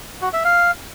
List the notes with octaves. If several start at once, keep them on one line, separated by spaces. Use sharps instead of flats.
F#4
E5
F5